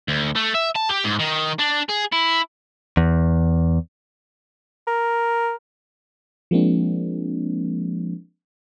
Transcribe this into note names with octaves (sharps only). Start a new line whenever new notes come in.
D2
A3
E5
A5
G4
G#2
D#3
D4
G#4
E4
E2
A#4
F3 G#3 A#3 C4 D4